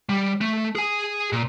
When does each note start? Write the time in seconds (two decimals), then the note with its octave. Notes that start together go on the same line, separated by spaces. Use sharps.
0.09 G3
0.41 A3
0.75 G#4 G#5
1.32 A#2